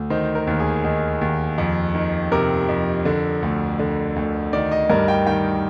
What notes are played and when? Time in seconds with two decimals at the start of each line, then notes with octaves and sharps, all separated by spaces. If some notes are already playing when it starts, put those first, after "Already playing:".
Already playing: D2
0.10 D#3 C5
0.35 A#4
0.47 D#2
0.60 G#4
0.84 D#3
1.21 D#2
1.58 F2
1.95 D#3
2.32 C3 A#4
2.68 F2
3.05 D3
3.43 D2
3.79 D3
4.16 D2
4.53 D#3 D5
4.72 D#5
4.90 G2 A#4
5.08 G5
5.27 D#3 G5